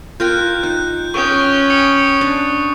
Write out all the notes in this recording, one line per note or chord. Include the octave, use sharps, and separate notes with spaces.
F4 A#4 G5 F#6 G6
D#4 F#6
C#4 G5 C#6 D#6
D#6 C#7
D4